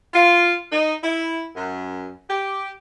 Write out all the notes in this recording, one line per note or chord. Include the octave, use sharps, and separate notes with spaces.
F4
D#4
E4
F#2
G4